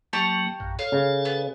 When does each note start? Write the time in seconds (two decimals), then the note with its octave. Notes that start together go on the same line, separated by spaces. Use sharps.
0.13 F#3 A#3 G4 A5 C#6
0.60 A#1 F#2 A#2
0.79 A4 C#5 F5
0.92 C#3
1.25 B3